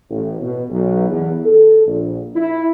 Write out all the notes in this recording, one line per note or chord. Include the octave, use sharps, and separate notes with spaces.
A1
B2
B1
E2
A4
A#1
E4